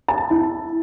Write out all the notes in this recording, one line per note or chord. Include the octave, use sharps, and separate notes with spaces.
A5
E4